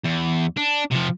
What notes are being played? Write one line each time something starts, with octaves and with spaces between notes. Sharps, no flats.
E2
D4
C3 F3